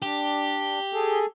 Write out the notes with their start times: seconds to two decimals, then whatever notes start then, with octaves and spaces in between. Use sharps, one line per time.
0.02 D4 G4
0.93 G#4 A4